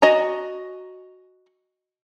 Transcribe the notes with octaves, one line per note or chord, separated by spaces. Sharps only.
F#4 D#5 G#5 A#5